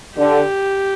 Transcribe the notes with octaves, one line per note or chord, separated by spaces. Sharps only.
D3 G4